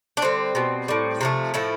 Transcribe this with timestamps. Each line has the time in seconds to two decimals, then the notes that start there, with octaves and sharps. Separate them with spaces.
0.17 D4
0.22 D3 G3 C4
0.55 B2 G3
0.88 A2 G3
1.21 C3 F3 A3
1.54 A2 F3 A3 E4